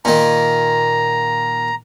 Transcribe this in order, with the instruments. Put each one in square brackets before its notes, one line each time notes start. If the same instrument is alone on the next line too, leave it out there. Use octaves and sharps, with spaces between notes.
[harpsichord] A#2 D#3 [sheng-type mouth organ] A#5